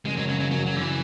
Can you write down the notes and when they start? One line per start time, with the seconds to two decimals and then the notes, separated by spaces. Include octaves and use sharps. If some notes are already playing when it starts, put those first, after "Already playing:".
0.05 F#1 G#3
0.17 F#3
0.28 C#3 F#3
0.40 F#3
0.51 F#2 F#3
0.66 F#3
0.74 F#1 D3
0.81 E3